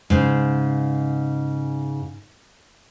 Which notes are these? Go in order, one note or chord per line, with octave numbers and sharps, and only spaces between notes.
G#2 C#3